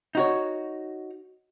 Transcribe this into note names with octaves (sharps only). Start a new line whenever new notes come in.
D#4 F#4 C#5